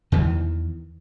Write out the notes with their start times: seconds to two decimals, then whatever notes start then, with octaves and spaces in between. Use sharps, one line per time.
0.12 E2 D#3 E3